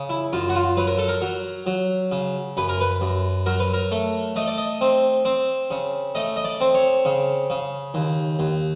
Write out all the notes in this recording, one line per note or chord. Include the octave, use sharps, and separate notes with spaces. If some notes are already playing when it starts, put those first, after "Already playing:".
Already playing: C#3
E4
F#2 F4
F#4
F4
F#3 B4
A#4
A4
A#4
F#3
F#3
C#3
F#2 B4
A#4
B4
F#2
F#3 A#4
B4
A#4
A3
A3 D#5
D5
D#5
C4
C4
C#3
A3 D#5
D#5
D5
C4
C#5
C#3
C#3
D#2
D#2